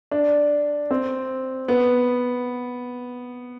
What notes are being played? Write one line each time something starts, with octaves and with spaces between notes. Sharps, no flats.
D4
C4
B3